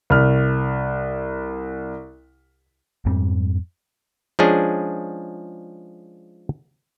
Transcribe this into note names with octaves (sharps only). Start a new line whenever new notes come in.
C2 F6
F2 G#2 G3 C4
F3 G#3 C#4 D4 G#4